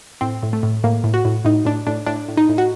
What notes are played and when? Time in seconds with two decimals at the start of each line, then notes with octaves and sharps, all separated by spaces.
0.21 A2 C4
0.43 A2
0.53 A3
0.63 A2
0.84 A2 A#3
1.04 A2
1.14 F#4
1.25 A2
1.45 A2 D#4
1.65 A2 D4
1.87 A2 D4
2.07 A2 D4
2.28 A2
2.37 D#4
2.49 A2
2.58 F#4